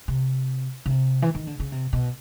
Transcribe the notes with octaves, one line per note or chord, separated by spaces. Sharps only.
C3
C#3
C3
E3
D#3
D3
C#3
C3
B2